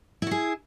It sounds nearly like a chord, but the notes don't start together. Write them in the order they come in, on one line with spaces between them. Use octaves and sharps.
E4 F#4 G#4